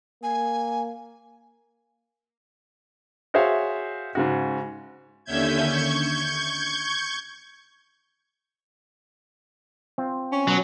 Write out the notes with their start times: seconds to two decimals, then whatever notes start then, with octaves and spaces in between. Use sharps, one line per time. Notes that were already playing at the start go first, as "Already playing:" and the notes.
0.23 A#3 G#5
3.34 F#4 G#4 C5 C#5 E5 F5
4.15 G#2 C#3 F#4
5.25 D#2 D3 C#4 E5 G6 G#6
5.66 C#6 G6 G#6
9.98 C4 F4
10.32 C#4
10.47 B2 F#3